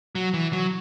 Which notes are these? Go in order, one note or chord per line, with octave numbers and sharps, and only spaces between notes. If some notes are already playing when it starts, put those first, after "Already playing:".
F#3
E3
F#3